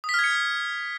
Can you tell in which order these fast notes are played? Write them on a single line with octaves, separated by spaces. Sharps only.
D#6 B6 F6 G#6 C#7